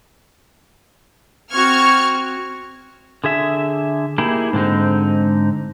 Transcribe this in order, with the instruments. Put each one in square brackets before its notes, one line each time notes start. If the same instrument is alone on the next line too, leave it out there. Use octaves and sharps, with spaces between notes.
[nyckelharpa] C4 F#4 [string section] C#6 F6 G#6
[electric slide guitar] D3 G#4 E5
A#3 D#4 E4 G4 G#4
G#2 D3 C4 D#4